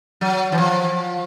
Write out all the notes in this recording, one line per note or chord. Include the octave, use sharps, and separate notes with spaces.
F#3
E3
F3